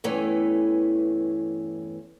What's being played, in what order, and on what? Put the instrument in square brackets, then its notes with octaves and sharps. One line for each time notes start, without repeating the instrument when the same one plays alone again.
[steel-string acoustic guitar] E2 G2 E3 A3 C#4